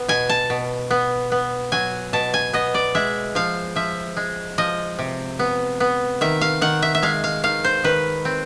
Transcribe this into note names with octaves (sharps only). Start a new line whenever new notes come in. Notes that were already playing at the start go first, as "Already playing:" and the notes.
Already playing: B3
B2 G#5
A5
B2
B3
B3
F#3 G#5
B2 A5
G#5
B3 D#5
D5
G#3 E5
F3 F5
F3 E5
G#3
F3 D#5
C3
B3
B3
D#3 E5
F5
D#3 F#5
E5
E5
G#3 F5
F5
D#3 F5
C5
D#3 B4
C4